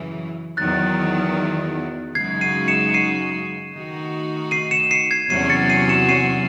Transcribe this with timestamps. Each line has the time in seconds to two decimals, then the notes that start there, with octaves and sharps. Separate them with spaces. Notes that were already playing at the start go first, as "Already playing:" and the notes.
Already playing: F#2 C#3 E3
0.57 E2 D#3 F#3 F#6 A6
2.15 F#2 C#3 G#3 D#4 F#4 G#6 C7
2.41 C7 D#7
2.68 C#7 E7
2.94 C7 D#7
3.73 D#3 A3 D#4 F#4
4.51 C7 D#7
4.71 C#7 E7
4.91 C7 D#7
5.11 G#6 C7
5.30 E2 C3 F#3 C#4 F#4 C7 D#7
5.49 A6 C#7
5.70 C7 D#7
5.89 C#7 E7
6.09 C7 D#7